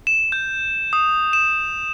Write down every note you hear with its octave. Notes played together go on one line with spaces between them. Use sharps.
E7
G6
D#6
E7